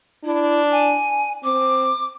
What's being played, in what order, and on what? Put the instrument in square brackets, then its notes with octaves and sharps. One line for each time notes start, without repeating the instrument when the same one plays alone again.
[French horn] D4 [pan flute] E4
[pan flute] G#5
[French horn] C4 [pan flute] D6